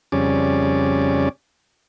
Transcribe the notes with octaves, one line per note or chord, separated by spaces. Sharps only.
F2 C#3 G3 C#4 D5